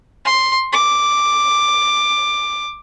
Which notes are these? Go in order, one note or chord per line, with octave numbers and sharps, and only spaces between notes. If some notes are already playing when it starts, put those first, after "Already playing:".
C6
D6